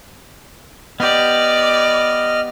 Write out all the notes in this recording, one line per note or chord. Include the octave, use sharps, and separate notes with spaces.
B3 G4 D5 D#5 F6